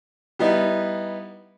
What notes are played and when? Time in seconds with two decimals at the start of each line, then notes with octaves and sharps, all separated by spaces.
0.39 G3 B3 D#4 E4